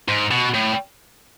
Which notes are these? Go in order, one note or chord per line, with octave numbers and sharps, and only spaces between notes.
G#2
B2
A2